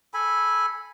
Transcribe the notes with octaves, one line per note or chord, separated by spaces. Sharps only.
A4 G#5 B5